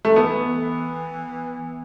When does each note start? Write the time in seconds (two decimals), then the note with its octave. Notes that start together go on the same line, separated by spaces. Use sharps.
0.05 A3
0.16 E3 B3